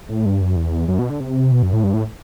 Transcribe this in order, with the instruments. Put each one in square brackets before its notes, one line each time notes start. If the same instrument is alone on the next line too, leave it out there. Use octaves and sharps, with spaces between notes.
[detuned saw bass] A2
G2
F#2
E2
F#2
B2
D3
C3
B2
F#2
A2
G2
A2